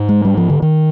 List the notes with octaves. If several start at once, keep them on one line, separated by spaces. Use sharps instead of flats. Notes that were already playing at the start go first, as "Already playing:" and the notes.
Already playing: G#2
G#3
G3
F3
D3
D#3